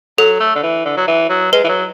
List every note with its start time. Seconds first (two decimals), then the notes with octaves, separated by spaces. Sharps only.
0.18 F#3 A4
0.40 A3
0.56 D3
0.63 E3
0.86 D3
0.97 F#3
1.08 E3
1.30 F#3
1.53 G#3 B4
1.64 E3
1.69 F#3